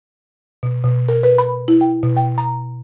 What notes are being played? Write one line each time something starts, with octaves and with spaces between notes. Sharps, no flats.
B2
B2
A#4
B4
B5
E4
G5
B2
G5
A#5